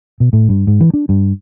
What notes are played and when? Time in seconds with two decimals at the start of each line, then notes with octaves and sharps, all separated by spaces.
0.20 B2
0.33 A2
0.49 G2
0.67 G#2
0.81 E3
0.94 D4
1.09 G2